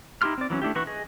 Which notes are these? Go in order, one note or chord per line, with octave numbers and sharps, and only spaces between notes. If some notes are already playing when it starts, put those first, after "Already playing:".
D#4 E4 G4 C6 F6
C4 D5
E3 F#3 A#3 C#4
A3 D4 E4 G4
E3 F#4 B4 C#6
G#4 D#5